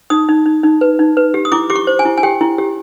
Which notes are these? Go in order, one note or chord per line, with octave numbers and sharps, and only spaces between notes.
D#4 D#6
D#4
D#4
D#4
B4
D#4
B4
G4
D#6
E4 D6
G4 D6
C#6
C5
G#5
E4
G#5
G4 G5
E4
G4